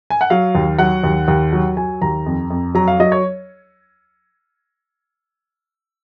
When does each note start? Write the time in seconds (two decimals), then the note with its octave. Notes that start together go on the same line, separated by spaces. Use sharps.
0.10 G#5
0.21 F#5
0.30 F#3 F5
0.55 D#2
0.79 F#3 F#5
1.04 D#2
1.28 D#2
1.53 F#3
1.77 F#3 G#5
2.02 D#2 A#5
2.26 F2
2.50 F2
2.75 F#3 A#5
2.88 F5
3.00 F#3 D#5
3.12 C#5